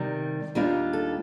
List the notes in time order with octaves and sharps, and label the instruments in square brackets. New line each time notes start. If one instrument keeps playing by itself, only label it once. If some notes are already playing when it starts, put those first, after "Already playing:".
Already playing: [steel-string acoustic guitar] C3 D#3 G3
D#2 D#3 G3 D4 F4
A4